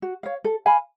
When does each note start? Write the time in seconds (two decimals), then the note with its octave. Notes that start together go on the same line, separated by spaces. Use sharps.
0.02 F#4
0.23 C#5 F5
0.44 A4
0.66 F5 G#5 B5